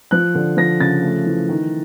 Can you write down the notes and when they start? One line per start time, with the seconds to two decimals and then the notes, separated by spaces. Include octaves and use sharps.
0.11 F3 F#6
0.35 D3
0.57 F3 A#6
0.80 C#3 A6
1.03 A3
1.26 E3
1.49 D#3